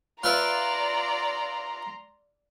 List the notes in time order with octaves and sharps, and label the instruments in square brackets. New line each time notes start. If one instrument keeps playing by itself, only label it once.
[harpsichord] F4 B4 E5 [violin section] D5 [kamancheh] A#5 C6